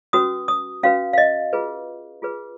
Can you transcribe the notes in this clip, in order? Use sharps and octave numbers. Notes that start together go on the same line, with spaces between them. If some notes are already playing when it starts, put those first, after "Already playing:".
C#4 F#4 B4 D#6
D#6
C#4 F#4 B4 F5
F5
D#5
F4 G#4 B4
F4 G#4 B4